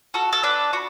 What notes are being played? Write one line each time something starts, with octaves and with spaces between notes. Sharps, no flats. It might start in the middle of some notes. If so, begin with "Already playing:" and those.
F#4 A4
A4
D4 B4
F#4